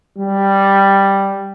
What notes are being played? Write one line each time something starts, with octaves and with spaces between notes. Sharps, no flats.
G3